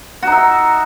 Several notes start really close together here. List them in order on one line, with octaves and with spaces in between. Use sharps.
F#4 D#4 E5